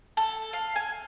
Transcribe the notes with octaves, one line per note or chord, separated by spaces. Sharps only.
A4
F5
G#5